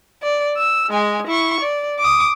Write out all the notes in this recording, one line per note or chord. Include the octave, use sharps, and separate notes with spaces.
D5
E6
G#3 G#5
E4 C#6
D5
D6 D#6